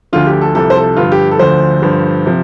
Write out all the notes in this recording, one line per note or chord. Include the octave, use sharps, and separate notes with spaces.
D2 D3 F3 F4
G4
A4
C2 C3 F3 A4
C5
A4
G2 D3 F3 F4
G4
A4
D2 D3 F3 C5
G2 D3 F3
C3 F3